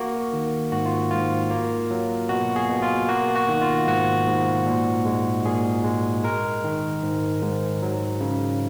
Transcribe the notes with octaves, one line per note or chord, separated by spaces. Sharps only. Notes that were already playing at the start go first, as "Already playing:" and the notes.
Already playing: A#3 F#4
D#3
G#2 F#4
F4
G#2 F4
A#3
F#3
B2 F#4
G#4
B2
F4
A#3 F#4
F#4
D#3
F4
G#2 F#4
G#2
A#2
G#3
A#2 G#4
G#3
G#3 A#4
D#3
G#2
G#2
F#3
C#3